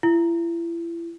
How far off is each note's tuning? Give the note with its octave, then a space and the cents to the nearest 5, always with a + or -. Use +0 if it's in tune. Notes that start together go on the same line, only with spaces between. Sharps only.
E4 +35